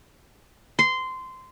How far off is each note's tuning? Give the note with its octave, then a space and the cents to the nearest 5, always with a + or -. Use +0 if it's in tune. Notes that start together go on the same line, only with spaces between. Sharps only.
C6 -15